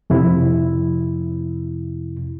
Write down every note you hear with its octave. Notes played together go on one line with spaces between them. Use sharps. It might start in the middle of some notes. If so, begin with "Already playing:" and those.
F2 C3 E4